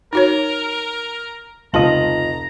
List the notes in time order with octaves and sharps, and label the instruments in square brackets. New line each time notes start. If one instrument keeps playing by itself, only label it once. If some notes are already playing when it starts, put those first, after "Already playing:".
[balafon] D#4 F#4 C#5 [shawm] A#4
[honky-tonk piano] F1 A5 F#7 [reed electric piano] C#2 F4 D#5 [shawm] A#5